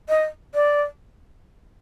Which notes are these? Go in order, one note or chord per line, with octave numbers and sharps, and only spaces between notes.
D#5
D5